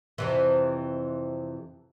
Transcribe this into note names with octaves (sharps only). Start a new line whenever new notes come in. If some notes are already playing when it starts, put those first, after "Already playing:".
F2 C3 E3